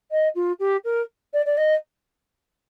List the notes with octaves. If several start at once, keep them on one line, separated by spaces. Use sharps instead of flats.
D#5
F4
G4
A#4
D5
D5
D#5